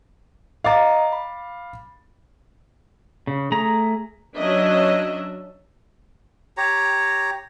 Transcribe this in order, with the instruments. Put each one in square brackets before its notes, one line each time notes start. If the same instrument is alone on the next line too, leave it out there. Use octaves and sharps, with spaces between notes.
[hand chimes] D#5 A#5 [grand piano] F5 D6 A6
[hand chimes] B5
[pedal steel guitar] C#3
A3 G#4 A#5
[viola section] F#3 C#4 D4 D#5 E5
[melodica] G4 C#5 A#5